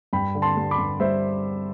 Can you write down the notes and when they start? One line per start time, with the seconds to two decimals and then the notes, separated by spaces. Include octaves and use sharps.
0.13 G2 G5 B5
0.35 D3
0.42 A5 C6
0.57 G3
0.71 B5 D6
0.79 G2
1.00 G3 C5 E5